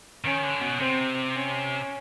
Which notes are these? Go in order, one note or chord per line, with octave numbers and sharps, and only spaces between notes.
D#3 C#4
D3
B2
C3 C4
C#4